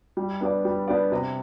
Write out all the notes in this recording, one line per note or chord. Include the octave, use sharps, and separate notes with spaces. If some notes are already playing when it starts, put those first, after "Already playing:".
G3
B3 D4 G4 D5
G3
B3 D4 G4 D5
C3